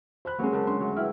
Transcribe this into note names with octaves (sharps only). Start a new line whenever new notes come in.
C5 B5 F#6
F#3 G#3 A#3 C4 C#4
C#3 A#4 A5
C#4 D4 C6
D2 F#3
E4 B4 G5 F6